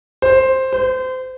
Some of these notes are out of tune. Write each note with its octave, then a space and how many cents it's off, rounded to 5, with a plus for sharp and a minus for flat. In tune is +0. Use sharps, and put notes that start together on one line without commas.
C5 +5
C5 -30